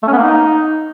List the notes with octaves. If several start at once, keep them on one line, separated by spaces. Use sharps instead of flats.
A3
C#4
B3
A#3
D#4